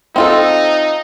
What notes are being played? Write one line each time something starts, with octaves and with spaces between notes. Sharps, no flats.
C4 D#4 F4 A4